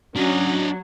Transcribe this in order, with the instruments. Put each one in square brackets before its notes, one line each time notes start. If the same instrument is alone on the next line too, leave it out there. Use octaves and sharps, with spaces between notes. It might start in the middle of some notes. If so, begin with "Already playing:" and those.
[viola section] F#3 [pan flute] C#4 [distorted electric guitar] D4 D#5